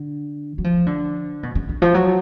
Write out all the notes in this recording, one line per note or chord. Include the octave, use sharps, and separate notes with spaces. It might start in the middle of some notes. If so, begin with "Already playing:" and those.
Already playing: D3
F#3
F3
D3
B2
C#3
D3
F3
F#3